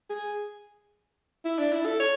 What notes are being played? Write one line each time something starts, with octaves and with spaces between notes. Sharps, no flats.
G#4
E4
D4
E4
A4
C#5